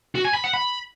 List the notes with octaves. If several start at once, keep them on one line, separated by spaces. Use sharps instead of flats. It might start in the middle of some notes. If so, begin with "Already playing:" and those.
F#4
G#5
B5
F#5
B5